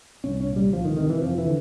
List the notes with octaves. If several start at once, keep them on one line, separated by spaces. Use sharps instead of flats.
C2 C#4
C#4
A#2
G3
C#2 F3
D#3
C3 D#3
E3
F2 F3
E3
D3